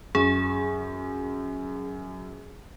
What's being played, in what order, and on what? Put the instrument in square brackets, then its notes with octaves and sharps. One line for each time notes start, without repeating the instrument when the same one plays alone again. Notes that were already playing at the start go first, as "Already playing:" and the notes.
[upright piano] F#2 [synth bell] G#4